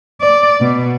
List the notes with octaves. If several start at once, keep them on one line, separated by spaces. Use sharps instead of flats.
D5
B2